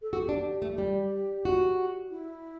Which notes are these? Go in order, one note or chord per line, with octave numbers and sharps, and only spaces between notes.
A4
F#4 G4
D4
A3
G3
F#4
E4